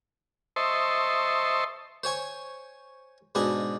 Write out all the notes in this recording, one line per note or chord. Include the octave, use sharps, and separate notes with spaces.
C5 D#5 E5 A5 C6 C#6
C5 C#5 G#5 C#6
G#2 B2 D4 D#5 G#5